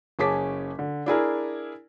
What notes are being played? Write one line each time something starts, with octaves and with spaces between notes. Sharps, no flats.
F#1 C#4 G#4 A5 D6 B6
D3
D4 E4 G#4 A#4